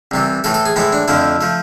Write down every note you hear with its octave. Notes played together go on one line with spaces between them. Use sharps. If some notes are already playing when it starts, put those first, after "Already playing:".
C2 C3 E3
A2 E3 A3 A4
A4
G#4
A2 E3 G#3 E4
D4
F2 D3 F3 A3 E4
F3 A3